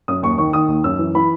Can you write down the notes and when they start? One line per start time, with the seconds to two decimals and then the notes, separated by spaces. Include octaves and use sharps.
0.08 F#2 D#6
0.23 D#2 C#6
0.38 D#3 C#6
0.53 D#3 D#6
0.68 D#2
0.84 F#2 E6
0.99 E3
1.15 E3 B5